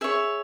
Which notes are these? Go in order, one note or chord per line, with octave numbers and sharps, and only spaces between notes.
G#4 C#5 E5